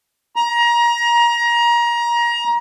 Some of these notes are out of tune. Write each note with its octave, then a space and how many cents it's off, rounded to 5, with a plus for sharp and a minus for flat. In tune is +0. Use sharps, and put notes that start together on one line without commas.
A#5 +25